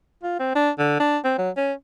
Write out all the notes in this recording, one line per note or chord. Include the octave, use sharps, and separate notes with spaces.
F4
C4
D4
D3
D4
C4
F#3
C#4